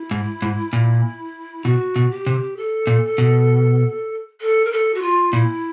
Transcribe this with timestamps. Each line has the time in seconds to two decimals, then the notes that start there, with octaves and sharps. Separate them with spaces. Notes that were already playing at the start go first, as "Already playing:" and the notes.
Already playing: E4
0.11 G#2
0.42 G#2
0.73 A#2
1.65 B2 F#4
1.96 B2
2.11 G4
2.26 C3
2.57 A4
2.87 A#2
3.18 B2
4.41 A4
4.65 A#4
4.72 A4
4.94 F#4
5.02 F4
5.33 A#2 E4